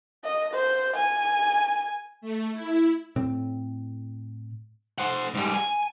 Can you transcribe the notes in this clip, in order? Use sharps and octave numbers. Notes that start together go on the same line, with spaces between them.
D#5
C5
G#5
A3
E4
A2 C4
C5 F#5
G#2 G3
G#5